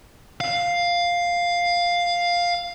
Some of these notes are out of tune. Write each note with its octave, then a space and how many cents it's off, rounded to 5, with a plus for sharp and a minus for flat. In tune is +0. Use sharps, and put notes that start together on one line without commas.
F5 +5